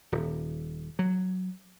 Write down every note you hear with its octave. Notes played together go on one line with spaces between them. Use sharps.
D#1
F#3